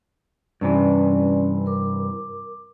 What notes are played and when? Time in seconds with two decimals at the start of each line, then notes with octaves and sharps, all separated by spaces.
0.61 G2 C3 E3 C#4 D5 G#5
1.66 A#4 D6